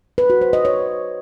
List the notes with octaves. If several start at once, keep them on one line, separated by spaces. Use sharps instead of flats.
B4
F#4
C5
D#5
C#5